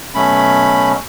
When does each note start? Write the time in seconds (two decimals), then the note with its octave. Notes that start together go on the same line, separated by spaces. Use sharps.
0.15 B2 F#3 A3 C#4 B5